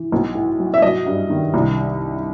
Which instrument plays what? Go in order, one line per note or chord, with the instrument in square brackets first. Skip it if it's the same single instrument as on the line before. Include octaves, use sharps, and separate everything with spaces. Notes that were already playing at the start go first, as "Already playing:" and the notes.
Already playing: [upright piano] E3
B1
A2
F#3
E5
F#3 D#5
G2
D#3
C2